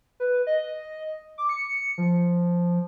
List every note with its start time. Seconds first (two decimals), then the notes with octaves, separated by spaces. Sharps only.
0.20 B4
0.47 D#5
1.38 D6
1.49 C#7
1.98 F3